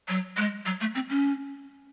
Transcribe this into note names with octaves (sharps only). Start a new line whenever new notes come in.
F#3
G#3
F#3
A3
C4
C#4